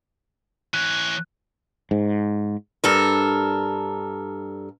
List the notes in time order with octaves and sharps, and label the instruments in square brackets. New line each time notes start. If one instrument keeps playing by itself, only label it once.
[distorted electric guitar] E3 C#5 [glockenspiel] F#6
[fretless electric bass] G#2
[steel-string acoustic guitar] G2 A4 A#4